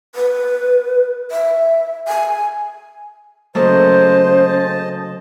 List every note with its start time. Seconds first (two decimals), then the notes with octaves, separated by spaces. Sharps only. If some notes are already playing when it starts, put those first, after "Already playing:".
0.15 B4
1.31 E5
2.08 G#5
3.55 C#3 F#3 A3 A#3 C5 D#5 A5